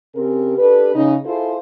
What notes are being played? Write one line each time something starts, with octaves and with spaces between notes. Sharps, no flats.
C#3 C4 G4 G#4 A#4
D4 G4 A4 B4
C#3 D#4
E4 F4 G#4 A4 C5